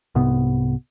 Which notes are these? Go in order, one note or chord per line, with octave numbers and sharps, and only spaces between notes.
C2 G#2 C3 B3